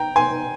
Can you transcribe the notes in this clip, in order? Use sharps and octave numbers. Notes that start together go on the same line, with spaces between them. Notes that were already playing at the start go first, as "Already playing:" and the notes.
Already playing: G5 A#5
G#5 C6